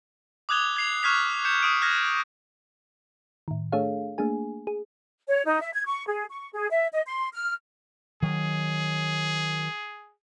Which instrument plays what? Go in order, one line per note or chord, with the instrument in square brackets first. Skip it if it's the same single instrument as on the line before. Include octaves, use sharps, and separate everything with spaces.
[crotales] D6 D#6 F#6 G#6 F7 G7
G#6 C7 F7
C#6 F6 F#6 G#6 B6 F7
G6 C#7 E7
C#6 D#6 D7
F6 F#6 G#6 A#6
[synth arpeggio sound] A2 D#3
A3 D4 G#4 A4 C#5 F5
A3 A#3 D4 G#4 G#5
G#4
[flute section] C#5
D#4
E5
G#6
C#6
G#4
C#6
G#4
E5
D#5
C6
F6
[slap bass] D#3 F#3 [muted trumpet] G#4